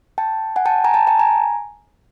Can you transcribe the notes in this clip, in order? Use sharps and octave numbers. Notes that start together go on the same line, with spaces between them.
G5 A5
F#5 G#5
G5 A5
G#5 A#5
G5 A5
G5 A5
G#5 A#5